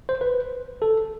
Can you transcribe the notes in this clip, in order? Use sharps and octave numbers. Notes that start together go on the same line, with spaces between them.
C5
B4
A4